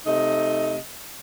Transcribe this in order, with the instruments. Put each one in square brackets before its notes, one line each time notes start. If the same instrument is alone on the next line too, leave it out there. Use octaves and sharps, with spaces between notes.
[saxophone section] C3 A3 D#4 D#5